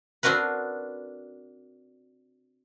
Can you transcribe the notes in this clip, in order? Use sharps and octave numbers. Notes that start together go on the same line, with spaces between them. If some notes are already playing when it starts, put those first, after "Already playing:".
C4 D4 F#4 A#4 B4